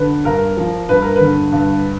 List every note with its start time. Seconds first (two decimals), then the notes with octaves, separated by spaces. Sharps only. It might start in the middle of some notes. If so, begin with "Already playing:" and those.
Already playing: D3 B4
0.25 G2 A#4
0.57 F3
0.89 G2 B4
1.02 A#4
1.16 D3 B4
1.52 G2